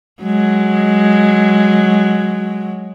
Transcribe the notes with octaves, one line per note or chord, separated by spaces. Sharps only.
F#3 G#3